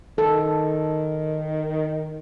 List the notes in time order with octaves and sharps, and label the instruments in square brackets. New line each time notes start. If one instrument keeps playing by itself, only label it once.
[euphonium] D#3 [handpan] A4